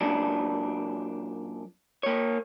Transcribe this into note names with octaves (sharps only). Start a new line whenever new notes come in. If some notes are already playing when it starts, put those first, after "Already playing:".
F#2 A#2 D4
A#3 C#5